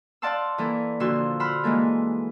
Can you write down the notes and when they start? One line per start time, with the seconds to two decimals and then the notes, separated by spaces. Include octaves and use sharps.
0.22 D5 F5 F#5 A5 C6 E6
0.58 E3 A#3 A4
1.00 A#2 D3 F3 F#4 C6 E6
1.40 F#5 B5 C6 E6 F6
1.64 E3 G#3 A#3 A4